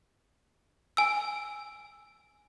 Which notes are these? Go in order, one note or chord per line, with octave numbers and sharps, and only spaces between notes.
G#5 E6